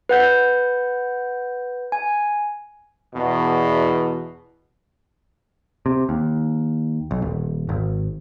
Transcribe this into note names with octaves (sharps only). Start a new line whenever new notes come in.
B4 F#5 G6
G#5
E2 B2
C3
D#2
B1
D#1
G#1